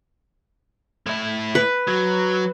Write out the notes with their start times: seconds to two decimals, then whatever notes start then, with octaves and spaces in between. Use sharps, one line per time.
1.07 A2 E4
1.55 B4
1.88 F#3